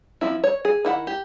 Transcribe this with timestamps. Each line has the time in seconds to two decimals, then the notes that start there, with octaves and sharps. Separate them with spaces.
0.21 F3 C4 E4
0.44 C#5
0.65 G#4
0.85 D#3 E4 F#5
1.07 G4